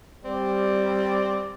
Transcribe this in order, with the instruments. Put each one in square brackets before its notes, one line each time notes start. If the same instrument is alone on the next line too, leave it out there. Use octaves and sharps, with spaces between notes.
[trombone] G3 [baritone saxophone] C4 [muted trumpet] D5